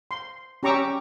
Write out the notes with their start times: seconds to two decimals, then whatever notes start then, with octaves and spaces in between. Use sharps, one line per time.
0.11 C6
0.63 C#4 G4 A#5 C#6 D6 E6